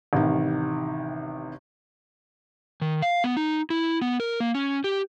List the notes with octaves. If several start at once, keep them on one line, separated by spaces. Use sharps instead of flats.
A1 C3 D#3
D#3
F5
B3
D#4
E4
B3
A#4
A#3
C#4
G4